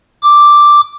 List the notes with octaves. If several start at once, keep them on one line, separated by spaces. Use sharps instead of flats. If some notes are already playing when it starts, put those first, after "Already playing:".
D6